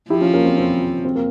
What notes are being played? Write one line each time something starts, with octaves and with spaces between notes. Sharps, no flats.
F3 E4 G4
C#4 F4
A#3 C#4
C4
C4
C4
A#3